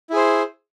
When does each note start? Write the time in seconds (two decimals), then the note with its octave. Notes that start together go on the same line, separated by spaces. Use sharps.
0.10 E4
0.13 G#4
0.16 C5